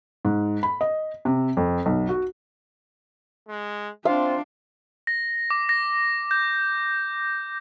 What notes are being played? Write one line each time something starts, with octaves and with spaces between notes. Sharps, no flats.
G#2
B5
D#5
C3
F2
B1
F#4
G#3
C4 D4 F4 F5
A#6
D6
A#6
G6